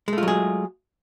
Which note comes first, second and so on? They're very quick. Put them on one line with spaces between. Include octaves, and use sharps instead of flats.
G#3 A3 F4 F#3 G#4